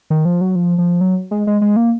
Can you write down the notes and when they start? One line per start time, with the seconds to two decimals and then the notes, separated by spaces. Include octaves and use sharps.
0.10 D#3
0.25 F3
0.41 F#3
0.55 F3
0.78 F3
1.01 F#3
1.31 G#3
1.47 G#3
1.61 G#3
1.76 A#3